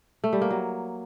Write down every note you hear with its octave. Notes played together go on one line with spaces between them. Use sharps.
A3
G3
A#3
F#3